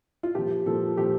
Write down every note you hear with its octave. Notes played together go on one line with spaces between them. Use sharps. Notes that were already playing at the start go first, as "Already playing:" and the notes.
F4
A#2 F3 G4
A#2 F3 A4
A#2 F3 G4